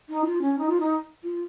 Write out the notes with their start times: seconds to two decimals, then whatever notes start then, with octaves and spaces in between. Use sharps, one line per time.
0.09 D#4
0.25 F4
0.42 C#4
0.59 D#4
0.69 F4
0.80 D#4
1.24 F4